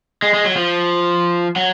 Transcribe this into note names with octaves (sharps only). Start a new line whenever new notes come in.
G#3
G#3
F#3
F3
F#3